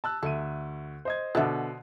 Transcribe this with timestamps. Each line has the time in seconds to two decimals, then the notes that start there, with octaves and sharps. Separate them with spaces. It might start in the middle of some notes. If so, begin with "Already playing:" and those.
0.04 A5 E6 F#6
0.23 D2 A4 E5 D#7
1.05 C5 D#5 G#6
1.35 B2 D3 B3 A4 E5